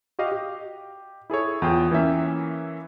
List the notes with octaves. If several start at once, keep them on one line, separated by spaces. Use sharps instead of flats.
F#4 G4 D#5 F5
G4
E4 G#4 A4 C#5
E2 F4 F5 G5 D#6
E3 A#3 C#4 E5